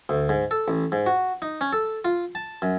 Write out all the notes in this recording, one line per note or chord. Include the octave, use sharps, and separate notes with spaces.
D2
G#2
A4
A1
G#2
F#4
D#4
C#4
A4
F4
A5
F#2